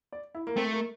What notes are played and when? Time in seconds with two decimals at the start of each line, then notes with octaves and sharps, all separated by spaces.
0.12 D5
0.35 E4
0.47 A#3
0.56 A3 C4
0.73 A#3